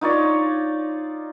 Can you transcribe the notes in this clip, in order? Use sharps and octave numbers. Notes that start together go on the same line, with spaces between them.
D#4 F4 C#5 D5